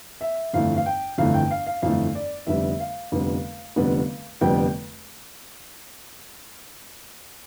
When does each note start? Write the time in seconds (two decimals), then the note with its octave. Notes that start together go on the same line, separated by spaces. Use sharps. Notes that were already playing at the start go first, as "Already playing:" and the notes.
0.21 E5
0.53 G1 F2 E3 A3 F5
0.77 F5
0.86 G5
1.18 G1 F2 E3 A3 F5
1.34 G5
1.51 F5
1.67 F5
1.82 G1 F2 E3 A3 F5
2.15 D5
2.47 F1 F2 D3 G3 B3 E5
2.80 F5
3.12 F1 F2 D3 G3 B3
3.76 F1 F2 D3 G3 B3
4.41 F1 F2 D3 G3 B3 G5